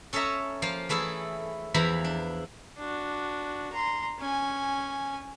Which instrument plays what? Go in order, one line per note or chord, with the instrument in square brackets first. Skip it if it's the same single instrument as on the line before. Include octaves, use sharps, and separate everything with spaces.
[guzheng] C#4 A4 C#5 D#5 E5 A#5
F3 A#3 F4 F5
E3 A3 E4 G#4 A4
E2 E3 F3 E4 A#5 B5
D4
[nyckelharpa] D4 F#4
A#5 C6
C#4 G#5